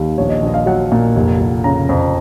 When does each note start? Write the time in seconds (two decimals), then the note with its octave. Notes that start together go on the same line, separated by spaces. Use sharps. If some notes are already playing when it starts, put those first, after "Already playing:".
Already playing: D#2
0.18 A#1 C#5
0.30 D#5
0.42 A#1 D#5
0.54 F5
0.66 F#3 F#5
0.92 A#2
1.16 F1
1.40 F1
1.64 C#3 A#5
1.89 F2